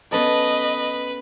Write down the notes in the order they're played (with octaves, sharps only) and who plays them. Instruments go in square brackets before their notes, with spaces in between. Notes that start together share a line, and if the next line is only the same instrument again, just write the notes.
[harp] B3 C#4 A4 [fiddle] B4 [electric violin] D#5